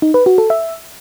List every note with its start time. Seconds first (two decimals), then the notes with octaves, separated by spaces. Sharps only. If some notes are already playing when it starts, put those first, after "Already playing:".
0.02 D#4
0.14 B4
0.26 F#4
0.38 A4
0.50 E5